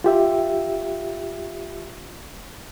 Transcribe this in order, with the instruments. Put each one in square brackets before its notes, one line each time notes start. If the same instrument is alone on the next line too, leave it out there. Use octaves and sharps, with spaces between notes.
[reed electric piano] F4 G4 E5